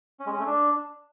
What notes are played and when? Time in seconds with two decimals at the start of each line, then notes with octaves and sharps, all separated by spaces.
0.20 C#4
0.26 G#3
0.33 C#4
0.40 A3
0.46 D4